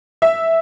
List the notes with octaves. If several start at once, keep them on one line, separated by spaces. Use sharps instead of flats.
E5